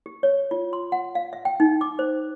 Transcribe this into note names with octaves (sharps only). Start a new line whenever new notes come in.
G4
C#5
F4
C6
F#5
F5
E5
G5
D#4
D6
C5